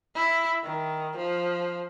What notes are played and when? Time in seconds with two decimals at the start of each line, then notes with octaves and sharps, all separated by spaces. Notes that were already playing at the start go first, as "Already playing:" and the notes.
0.15 E4
0.64 D#3
1.17 F3